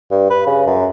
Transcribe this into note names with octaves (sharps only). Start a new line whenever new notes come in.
G2
B4
C#3
F#2